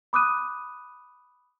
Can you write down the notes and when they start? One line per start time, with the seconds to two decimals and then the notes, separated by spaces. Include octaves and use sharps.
0.13 B5 D6 D#6 F#6 D#7